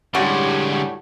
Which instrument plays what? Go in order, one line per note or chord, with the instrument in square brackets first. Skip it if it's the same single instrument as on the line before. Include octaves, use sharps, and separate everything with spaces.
[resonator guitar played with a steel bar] A2 C#4 F#4 [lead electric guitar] D3 G#3 [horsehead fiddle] G3 G4